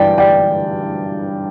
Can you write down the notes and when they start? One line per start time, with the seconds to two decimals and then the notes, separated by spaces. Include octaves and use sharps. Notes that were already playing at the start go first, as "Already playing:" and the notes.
Already playing: G2 E3 D5 G5
0.18 D5 G5